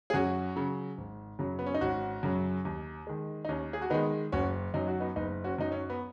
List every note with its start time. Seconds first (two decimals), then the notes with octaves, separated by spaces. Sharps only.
0.10 G#4
0.13 F#2 C#4 F#4
0.56 C#3 F#3
0.98 G#1
1.39 F#2 C#3 F#3
1.59 B3
1.66 C#4
1.74 D#4
1.81 G#1 C#4 F#4
2.23 F#2 C#3 F#3
2.65 D#2
3.07 D#3 G#3
3.45 D#4
3.48 D#2 C#4
3.73 G#4
3.82 F#4
3.90 D#3 G#3 B3 D#4
4.32 F#1 C#4 F#4
4.74 F#2 F#3 D#4
4.88 F#4
5.00 B3 D#4
5.16 F#1 B3 D#4
5.44 C#4 F#4
5.58 F#2 F#3 D#4
5.72 C#4
5.90 B3